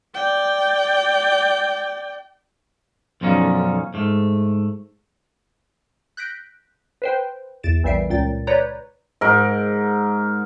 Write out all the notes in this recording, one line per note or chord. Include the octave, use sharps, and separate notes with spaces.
D5 G5
B1 F#2 D3 F3 C#4 D#4
G#2 A3
F#6 G6 A#6 B6 D7
B4 C5 G5
E2 A6 D7 E7
A#1 E3 G3 E5 C7 D7
C#2 A#2 G5 A6
B4 C#5 D5 A#5 G6 A#6
G#2 A#4